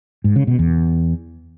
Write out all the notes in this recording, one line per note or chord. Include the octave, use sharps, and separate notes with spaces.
G#2
C#3
B2
E2